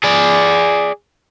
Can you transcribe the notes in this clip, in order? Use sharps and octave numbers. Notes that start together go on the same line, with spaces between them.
G#4 D5